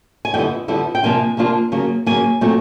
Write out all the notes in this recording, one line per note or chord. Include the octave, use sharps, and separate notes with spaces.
G#5
F2 D3 G3 B3 E4 G5
F2 D3 G3 B3 E4
G5
C3 F3 A#3 D4 F4 G#5
C3 F3 A#3 D4 F4
C#3 F#3 A#3
C#3 F#3 A#3 G#5
A#2 F#3 A3 C4